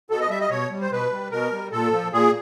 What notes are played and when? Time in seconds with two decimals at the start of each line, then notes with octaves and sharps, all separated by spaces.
0.10 B2 A4
0.21 D#5
0.30 G3 E5
0.41 D#5
0.50 B2 C#5
0.71 G3
0.81 C5
0.91 B2 B4
1.12 G3
1.31 B2 A#4
1.52 G3
1.72 A#2 A4
1.92 F3
2.12 A#2 G#4